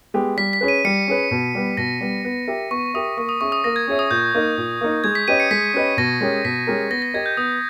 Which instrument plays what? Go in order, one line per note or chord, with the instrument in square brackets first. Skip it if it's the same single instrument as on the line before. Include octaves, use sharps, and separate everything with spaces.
[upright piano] G#3 B3 G4
[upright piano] G3 [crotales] B6
[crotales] B6
[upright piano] C#4 G#4 B4
[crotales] D#7
[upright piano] G3 [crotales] C#7
[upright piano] C#4 G#4 B4
B2
G3 B3
[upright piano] B2 [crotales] A#6
[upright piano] G3 B3
B3
G4 A#4 E5
[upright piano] B3 [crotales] C#6
[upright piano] G4 A#4 E5 [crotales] D#6
[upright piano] A#3 [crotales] C#6
[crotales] D#6
[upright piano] C#4 G#4 C#5 E5 [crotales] C#6
[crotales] D#6
[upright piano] A#3 [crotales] A#6
[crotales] G#6
[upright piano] C#4 G#4 C#5 E5
[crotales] D#6
[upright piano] A#2 [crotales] G6
[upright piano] A#3 D#4
A#2
A#3 D#4
[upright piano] G#3 [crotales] G#6
[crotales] B6
[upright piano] C#4 G4 B4 D#5 [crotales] D#7
[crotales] C#7
[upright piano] G#3 [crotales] B6
[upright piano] C#4 G4 B4 D#5
[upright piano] B2 [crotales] A#6
[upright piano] G#3 C#4 G4 A#4
[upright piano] B2 [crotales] B6
[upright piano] G#3 C#4 G4 A#4
[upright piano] B3 [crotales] A#6
[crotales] A#6
[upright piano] G4 A#4 D#5 [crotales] G#6
[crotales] G6
[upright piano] B3 [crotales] D#6